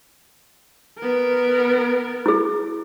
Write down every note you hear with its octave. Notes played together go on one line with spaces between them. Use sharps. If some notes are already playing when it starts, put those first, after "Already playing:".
B3 A#4
E4 G#4